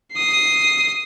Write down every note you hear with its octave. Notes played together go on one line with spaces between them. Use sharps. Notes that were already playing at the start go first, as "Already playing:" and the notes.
D#6 C7